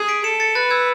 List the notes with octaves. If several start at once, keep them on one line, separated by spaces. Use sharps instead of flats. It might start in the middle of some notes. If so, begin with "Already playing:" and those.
Already playing: G#4
B6 D7
A4 C#7 E7
A6 C#7
B4 F#6 A6
E6 G#6